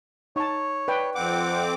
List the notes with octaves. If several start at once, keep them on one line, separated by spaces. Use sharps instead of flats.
D#4 C#5 A5
B4 D5 G5
F2 C4 F#5 D6